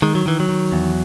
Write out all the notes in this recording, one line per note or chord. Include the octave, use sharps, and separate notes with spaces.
D#3 G#3
F#3
D#3 E3
F#3
D#3
E2